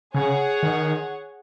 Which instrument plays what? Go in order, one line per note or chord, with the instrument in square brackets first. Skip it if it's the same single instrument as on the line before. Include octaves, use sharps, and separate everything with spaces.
[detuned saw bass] C#3 [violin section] G#4 C#5 F#5
[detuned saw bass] D#3